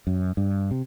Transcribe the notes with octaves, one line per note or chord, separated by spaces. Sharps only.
F#2
G2
C3